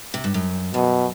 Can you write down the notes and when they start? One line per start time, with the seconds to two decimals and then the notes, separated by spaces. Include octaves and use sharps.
0.14 C3
0.24 G2
0.34 F#2
0.74 F#2 B2